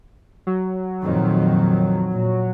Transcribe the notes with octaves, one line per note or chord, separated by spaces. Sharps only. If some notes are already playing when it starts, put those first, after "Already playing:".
F#3
F2 A#2 D#3
A#2